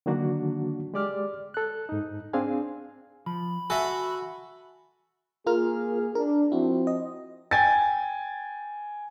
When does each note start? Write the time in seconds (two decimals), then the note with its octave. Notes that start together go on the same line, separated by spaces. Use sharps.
0.06 D3 D#3 F#3 A#3 D4 F#4
0.94 G#3 G4 D5 D6 F6
1.54 A4 F#6
1.89 G#2 D#4
2.33 C4 D4 G#4 F5 G#5
3.26 F3 B5
3.70 F#4 A4 E5 G#5
5.47 A#3 F4 G#4 A#4 F6
6.15 D4 A#4
6.52 F3 C4 E4 F#4
6.87 D#5
7.51 G5 G#5 A6